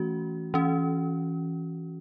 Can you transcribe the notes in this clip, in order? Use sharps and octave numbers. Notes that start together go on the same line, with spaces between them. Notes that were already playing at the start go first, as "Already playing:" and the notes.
Already playing: E3 A3 C#4 F#4
E3 C#4